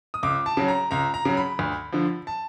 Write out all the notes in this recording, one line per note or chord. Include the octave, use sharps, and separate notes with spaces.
D#6
C#2 D6
A5
C#3 F#3
A#5
C#2 A#5
A#5
C#3 F#3
B5
D2
D3 F3
A5